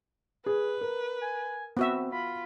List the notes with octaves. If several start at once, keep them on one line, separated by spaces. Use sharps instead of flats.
G#4 B4
A#4
G#5
B3 C4 F#4 E5
F4 B5